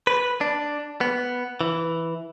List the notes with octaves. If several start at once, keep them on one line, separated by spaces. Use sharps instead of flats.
B4
D4
B3
E3